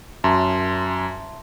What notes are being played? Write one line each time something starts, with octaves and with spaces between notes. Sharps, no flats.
F#2 E5 A5 C6